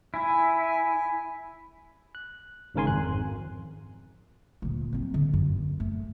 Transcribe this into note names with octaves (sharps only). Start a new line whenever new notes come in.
E4 G#5
F#6
G#1 G#2 C#3 A#4 G#5 C6
G#1 F2 F#6
D2 A#2
F#3 C4
D3
F#2
A3